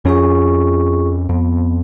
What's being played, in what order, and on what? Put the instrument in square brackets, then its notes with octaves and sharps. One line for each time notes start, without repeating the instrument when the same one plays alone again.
[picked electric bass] F2 C#4 [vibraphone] F4 G#4 C#6
[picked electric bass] F2 [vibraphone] B3